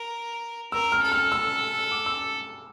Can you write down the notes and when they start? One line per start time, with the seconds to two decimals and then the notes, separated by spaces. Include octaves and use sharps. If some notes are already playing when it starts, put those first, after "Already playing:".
Already playing: A#4
0.72 A#4 E6
0.92 F6
1.02 A4
1.12 F6
1.32 E6
1.92 D6
2.06 E6